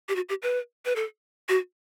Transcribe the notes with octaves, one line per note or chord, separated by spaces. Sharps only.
G4
F#4
G4
B4
B4
A4
F#4